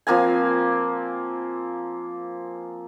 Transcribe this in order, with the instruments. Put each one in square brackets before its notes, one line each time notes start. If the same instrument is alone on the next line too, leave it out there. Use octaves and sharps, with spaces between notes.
[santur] F3 A#3 C4 G#5